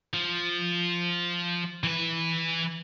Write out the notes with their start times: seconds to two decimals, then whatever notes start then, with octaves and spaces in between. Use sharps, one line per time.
0.14 F3
1.84 E3 B4